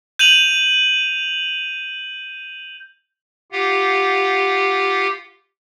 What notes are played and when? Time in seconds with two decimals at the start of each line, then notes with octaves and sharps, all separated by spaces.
0.19 G6 D#7 F7 F#7
3.52 F4 G4 F5 F#5